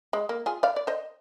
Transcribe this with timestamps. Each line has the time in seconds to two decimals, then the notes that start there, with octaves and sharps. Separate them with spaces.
0.13 G#3
0.29 A#3
0.46 F4 G#4
0.63 D5 F5
0.76 D5
0.87 C5 D#5